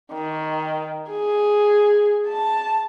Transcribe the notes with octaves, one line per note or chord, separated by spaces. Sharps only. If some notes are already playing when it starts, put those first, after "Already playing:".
D#3
G#4
A5